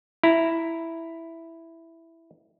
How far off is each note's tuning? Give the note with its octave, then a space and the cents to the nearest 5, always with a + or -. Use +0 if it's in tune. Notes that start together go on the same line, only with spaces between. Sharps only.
E4 +0 A#5 +0